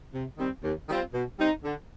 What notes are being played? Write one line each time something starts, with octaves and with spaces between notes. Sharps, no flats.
C3
D#3 G3 C4
D#2
D#3 G3 C4 F4
B2
G3 C4 D#4
D3